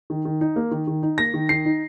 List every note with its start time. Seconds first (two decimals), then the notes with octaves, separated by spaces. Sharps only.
0.10 D#3
0.25 D#3
0.41 D#4
0.56 A#3
0.71 D#3
0.87 D#3
1.03 D#4
1.18 A#3 A#6
1.34 D#3
1.49 D#3 C7
1.65 D#4